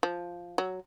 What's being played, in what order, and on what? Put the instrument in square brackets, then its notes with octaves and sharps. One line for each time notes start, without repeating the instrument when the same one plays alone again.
[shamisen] F3
F#3